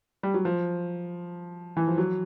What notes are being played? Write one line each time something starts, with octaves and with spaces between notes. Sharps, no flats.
G3
F#3
F3
E3
F3
F#3